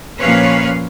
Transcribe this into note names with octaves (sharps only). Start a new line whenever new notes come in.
A#2 F3 C#4 B4 C#5 F5